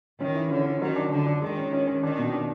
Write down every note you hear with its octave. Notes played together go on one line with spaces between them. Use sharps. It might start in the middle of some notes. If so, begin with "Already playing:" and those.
D#3 C#4
E3
D3 C#4
C#4
D#3 F#3
D4
D3 D4
D4
D#3 G#3
C#4
C#4
C#4
D#3 D4
B2
D4